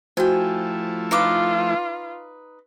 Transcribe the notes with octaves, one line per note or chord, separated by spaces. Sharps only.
F3 A3 E4 F#4 C5 G5 G#5
D#4 F4 B4 D6